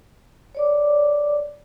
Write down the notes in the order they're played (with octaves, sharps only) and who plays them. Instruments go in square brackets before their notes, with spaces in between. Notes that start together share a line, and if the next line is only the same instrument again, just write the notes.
[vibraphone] C#5 D5 D6